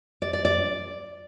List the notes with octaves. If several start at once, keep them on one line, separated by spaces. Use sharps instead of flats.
D5
D5
D5